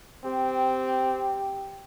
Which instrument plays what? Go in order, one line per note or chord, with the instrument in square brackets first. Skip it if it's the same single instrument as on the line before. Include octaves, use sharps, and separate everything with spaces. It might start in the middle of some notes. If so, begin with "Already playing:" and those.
[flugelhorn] C4 [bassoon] G4